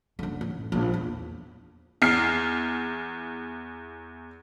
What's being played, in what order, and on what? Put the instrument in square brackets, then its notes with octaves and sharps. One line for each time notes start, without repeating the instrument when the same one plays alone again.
[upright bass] F#1 D3
A1
A#1
E2
[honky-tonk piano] E2 F6 C7